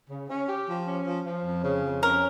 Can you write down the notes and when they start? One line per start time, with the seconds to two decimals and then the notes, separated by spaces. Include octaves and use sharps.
0.10 C#3
0.30 C#4
0.49 G4
0.68 F3
0.87 C#4
1.07 F3
1.26 F3
1.45 F2
1.64 C#3
1.83 F2
2.02 C#4 A#4